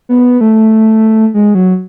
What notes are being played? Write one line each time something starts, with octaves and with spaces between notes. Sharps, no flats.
B3
A3
G#3
F#3